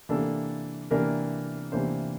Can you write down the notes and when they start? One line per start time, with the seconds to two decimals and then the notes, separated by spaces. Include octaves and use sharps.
0.09 C3 E3 A#3 D4 A4
0.91 C3 E3 A#3 D4 A#4
1.72 C3 E3 A#3 D4 C5